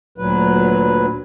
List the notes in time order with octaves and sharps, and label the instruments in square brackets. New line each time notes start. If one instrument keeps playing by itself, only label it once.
[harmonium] D2 A#2 F#3 B4